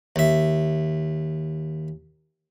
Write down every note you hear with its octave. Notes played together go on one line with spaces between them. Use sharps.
D#2 E5